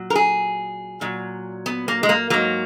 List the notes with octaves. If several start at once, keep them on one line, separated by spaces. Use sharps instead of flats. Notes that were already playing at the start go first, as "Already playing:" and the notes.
Already playing: A#2 F#3
A#4
G#4
A#2 F#3
B3
A#3
G#3
A#3
G#2 F#3 A#3